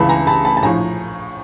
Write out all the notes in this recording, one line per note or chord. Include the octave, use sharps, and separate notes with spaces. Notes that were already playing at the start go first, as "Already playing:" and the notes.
Already playing: C#2 C#3 E3 A5 B5
G#5 A#5
A5 B5
A5 B5
A5
A#1 A2 F3 G#5 A#5